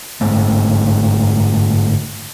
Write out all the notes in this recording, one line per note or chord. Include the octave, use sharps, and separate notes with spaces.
G1 G#2 G#3 A3